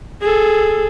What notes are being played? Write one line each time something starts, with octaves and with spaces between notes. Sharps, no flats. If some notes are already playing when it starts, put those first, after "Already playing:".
G#4 A4